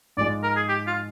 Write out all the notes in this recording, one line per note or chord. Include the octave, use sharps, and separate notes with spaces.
G#2 F3 G#3 D5
A#4
G#4
G4
F4